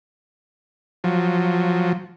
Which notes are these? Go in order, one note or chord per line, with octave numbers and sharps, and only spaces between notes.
F3 F#3